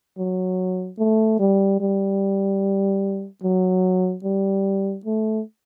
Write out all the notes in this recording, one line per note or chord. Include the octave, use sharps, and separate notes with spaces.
F#3
A3
G3
G3
F#3
G3
A3